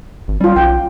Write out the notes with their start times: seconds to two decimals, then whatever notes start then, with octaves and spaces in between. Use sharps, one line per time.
0.28 G#1
0.41 G3 C#4 F4
0.56 B1 G5